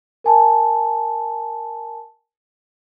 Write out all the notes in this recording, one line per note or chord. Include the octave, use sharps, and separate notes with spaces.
A#4 G#5 A5